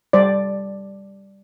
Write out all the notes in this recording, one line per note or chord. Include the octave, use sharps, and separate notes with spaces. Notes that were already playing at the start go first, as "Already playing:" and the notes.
G3 C5 D5